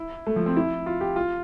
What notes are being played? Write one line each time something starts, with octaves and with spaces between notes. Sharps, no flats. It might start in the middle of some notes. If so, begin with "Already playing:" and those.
Already playing: E4
A3
F3
C4
E4
F4
G4
F4